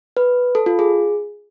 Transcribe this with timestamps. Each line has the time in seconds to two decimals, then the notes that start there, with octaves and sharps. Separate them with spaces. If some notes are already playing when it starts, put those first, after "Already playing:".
0.17 B4
0.55 A4
0.66 F4
0.79 G#4